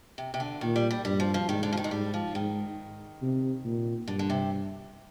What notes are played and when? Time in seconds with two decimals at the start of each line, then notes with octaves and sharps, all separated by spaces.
0.18 C3
0.34 C3
0.40 D3
0.61 A#2 D#3
0.76 G3
0.91 G3
1.05 G2 G3
1.20 F3
1.34 F3
1.48 G#2 D#3
1.63 D3
1.73 F3
1.77 D#3
1.84 G#3
1.91 G#2 G3
2.14 F3
2.34 G#2 D#3
3.22 C3
3.64 A#2
4.08 G2 D3
4.19 D3
4.30 C3